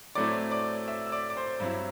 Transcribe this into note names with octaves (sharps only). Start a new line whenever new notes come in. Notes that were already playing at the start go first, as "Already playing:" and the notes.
A2 F#3 A3 C4 E4 D5 D6
D5 D6
E5 E6
E6
D5 D6
D6
C5 C6
G2 F#3 C4 E4